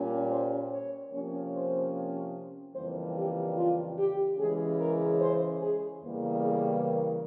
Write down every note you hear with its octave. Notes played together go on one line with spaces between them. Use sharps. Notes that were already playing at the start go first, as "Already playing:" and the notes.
Already playing: A#2 G3 C#4
C5
C#5
C3 F3 A#3 C#4
C5
F2 C#3 E3 G3 A#3 C5
G4
F4
G4
C#3 E3 G#3 C#4 G#4
A#4
C5
G#4
E2 C#3 E3 G3 A#3
G#4
A#4